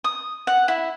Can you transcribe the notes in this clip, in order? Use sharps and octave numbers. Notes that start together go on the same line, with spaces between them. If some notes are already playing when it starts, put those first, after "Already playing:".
D#6
F#5
E4